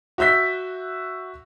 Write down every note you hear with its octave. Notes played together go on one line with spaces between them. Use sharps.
F#4 E5 E6 G6 B6